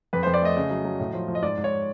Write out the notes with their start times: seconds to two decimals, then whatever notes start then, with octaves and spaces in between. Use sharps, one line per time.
0.13 F2 B4
0.23 C5
0.27 F2
0.34 D5
0.42 A3 D#5
0.57 C#3
0.70 F#3
0.85 F#3
1.00 A2
1.14 F3
1.28 F3
1.35 D#5
1.43 G#2 D5
1.58 G#2
1.64 C#5